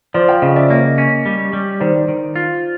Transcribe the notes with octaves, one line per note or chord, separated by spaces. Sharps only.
F3 C5 D5
F5 G5
C#3 D#5 F5
D5 E5
A#3 C#5 D#5
C#4
G3
G3
D#3 C5 D5
D#3
F4